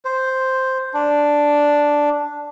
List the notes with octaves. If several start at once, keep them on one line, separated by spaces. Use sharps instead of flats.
C5
D4